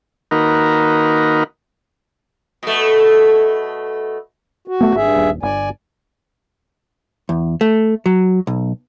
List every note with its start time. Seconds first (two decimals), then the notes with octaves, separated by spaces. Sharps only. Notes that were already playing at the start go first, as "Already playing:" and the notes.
0.31 D#3 A#3 D#4 F#4 A#4 B4
2.63 B2 A3
4.68 F#4
4.81 D1 A3 B3
4.95 G#1 G2 G#4 E5
5.16 D#1
5.43 G1 D5 G#5
7.29 E2
7.61 A3
8.06 F#3
8.47 B1